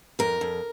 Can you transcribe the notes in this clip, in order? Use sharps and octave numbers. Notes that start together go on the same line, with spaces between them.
F2 A#4
F2